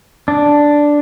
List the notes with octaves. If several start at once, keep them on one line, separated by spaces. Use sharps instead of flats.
D4